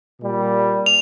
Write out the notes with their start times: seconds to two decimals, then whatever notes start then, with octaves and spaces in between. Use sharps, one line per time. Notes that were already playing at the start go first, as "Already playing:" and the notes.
0.21 A#2 G3 A#3
0.86 F7